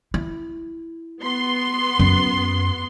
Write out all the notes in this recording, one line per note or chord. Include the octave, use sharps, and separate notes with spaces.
E4
B3 C6
F#2